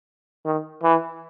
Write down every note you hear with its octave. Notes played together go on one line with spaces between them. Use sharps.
D#3
E3